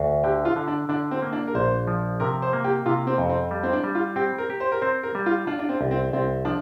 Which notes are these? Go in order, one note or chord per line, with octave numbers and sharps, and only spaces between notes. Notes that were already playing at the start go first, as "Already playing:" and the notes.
Already playing: D2
D3 G4
F4
D3
D4
D3 D4
C4
A#3
D4
A#4
A#1 C5
F3
C3 A#4
C5
A#3
G4
C3 F4
C4
F2
C4
G3
C4
D4
G3
F4
C4 G4
A#4
G4
C5
A#4
C4 C5
A#4
G3
F4
D4 F4
D4
C4
C2
C4
C2 C4
F3 D4